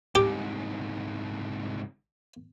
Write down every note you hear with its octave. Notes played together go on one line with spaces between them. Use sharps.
C2 G#2 G4